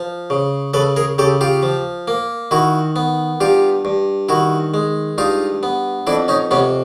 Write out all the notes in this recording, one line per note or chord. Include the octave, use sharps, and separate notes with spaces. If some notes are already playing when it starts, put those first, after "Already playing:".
Already playing: F3
C#3
C#3 A4 B4
G#4 A#4
C#3 G4 A4
F4 G4
F3
A#3
D#3 E4 F#4
B3
G2 F4 G4
G2
D#3 E4 F#4
G#3
G2 D#4 F4
B3
F2 D4 E4
C#4 D#4
C3 B3 C#4